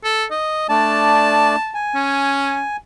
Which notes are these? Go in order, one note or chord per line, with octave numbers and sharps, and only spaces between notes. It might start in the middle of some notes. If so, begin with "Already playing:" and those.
A4
D#5
A3 D4 D5 A5
G#5
C#4